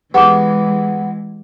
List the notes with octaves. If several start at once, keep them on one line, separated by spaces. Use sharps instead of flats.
E3 G#3 B3 G4 G#4 D6